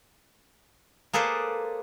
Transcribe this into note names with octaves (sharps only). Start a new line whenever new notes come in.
A#3 G#4 A4 B4 C5 D5